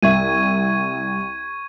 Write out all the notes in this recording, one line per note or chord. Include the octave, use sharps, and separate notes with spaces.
C2 E5 C#6 G#6 D#7